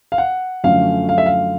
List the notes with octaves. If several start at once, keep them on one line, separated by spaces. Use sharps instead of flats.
F5
F#5
F#2 D3 F3 A3 C#4 F5
F5
E5
F5